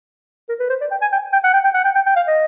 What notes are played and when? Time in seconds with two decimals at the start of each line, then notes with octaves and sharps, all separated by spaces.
0.49 A#4
0.60 B4
0.70 C5
0.81 D5
0.91 G5
1.01 G#5
1.12 G5
1.33 G5
1.44 F#5
1.54 G5
1.64 G5
1.75 F#5
1.85 G5
1.95 G5
2.06 G5
2.16 F5
2.28 D#5